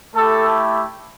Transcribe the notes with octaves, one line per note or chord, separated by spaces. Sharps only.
A3 E4 G4 A4